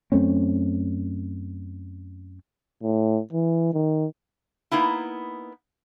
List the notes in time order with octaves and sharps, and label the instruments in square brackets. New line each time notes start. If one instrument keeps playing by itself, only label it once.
[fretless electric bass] F#2 A3 C4 C#4
[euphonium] A2
E3
D#3
[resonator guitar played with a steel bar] A#3 B3 D#4 E4